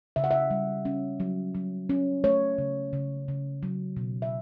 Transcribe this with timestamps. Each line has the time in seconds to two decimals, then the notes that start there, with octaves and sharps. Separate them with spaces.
0.16 C#3 E5
0.24 F#5
0.31 E5
0.50 G3
0.85 C#4
1.20 F#3
1.55 F#3
1.89 C#4
2.24 A3 C#5
2.58 C#3
2.93 C#3
3.28 C#3
3.63 F#3
3.97 B2
4.22 E5